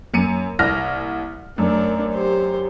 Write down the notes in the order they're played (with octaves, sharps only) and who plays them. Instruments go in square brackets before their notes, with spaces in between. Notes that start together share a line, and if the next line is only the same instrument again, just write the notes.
[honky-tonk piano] F#2 C#7 D#7 [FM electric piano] A#3
[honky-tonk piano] C2 F6 A#6
[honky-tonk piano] F#2 [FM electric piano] A3 [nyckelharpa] D4 A#4
[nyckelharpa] G4 C5